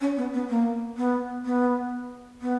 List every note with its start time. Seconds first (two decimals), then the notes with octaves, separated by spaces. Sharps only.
0.01 C#4
0.17 B3
0.33 B3
0.49 A#3
0.97 B3
1.45 B3
2.42 B3